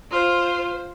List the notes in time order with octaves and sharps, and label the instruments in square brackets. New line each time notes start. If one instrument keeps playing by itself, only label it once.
[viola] F4 [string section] C5